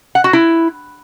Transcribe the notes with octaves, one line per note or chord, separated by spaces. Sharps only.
F#5
F#4
E4